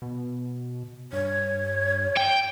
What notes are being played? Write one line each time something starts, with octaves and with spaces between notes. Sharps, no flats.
B2
G2 C#5
G5